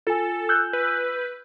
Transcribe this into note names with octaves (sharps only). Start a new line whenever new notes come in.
F4 A4 G#5
E6 F#6 G6
B4